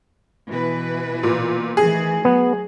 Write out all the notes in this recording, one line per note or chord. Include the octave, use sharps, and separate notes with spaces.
B2 E3 B4
A#2
D#3 E3 A3 G#4
F#3 B3